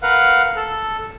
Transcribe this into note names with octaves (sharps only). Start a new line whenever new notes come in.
A#4 B4 F5 F#5
A4